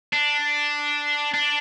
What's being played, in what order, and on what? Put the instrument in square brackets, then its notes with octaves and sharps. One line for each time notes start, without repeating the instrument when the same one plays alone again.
[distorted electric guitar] D4
D4